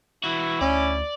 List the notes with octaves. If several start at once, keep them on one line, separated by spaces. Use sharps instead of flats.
E3 E4 F#4
D2 C#4 D5